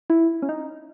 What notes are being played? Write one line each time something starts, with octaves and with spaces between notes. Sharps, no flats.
E4
C#4
D#4